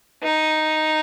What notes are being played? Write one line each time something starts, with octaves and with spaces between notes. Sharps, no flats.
D#4